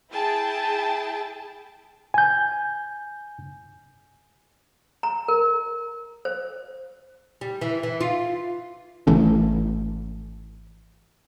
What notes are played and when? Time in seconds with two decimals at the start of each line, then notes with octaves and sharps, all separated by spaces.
0.12 E4 G#4 G5 A5
2.14 G#5 G6
5.03 A#5
5.28 A#4
6.25 C5
7.41 G3
7.61 E3
7.83 E3
8.01 F4
9.07 G#1 E3 A3 C#4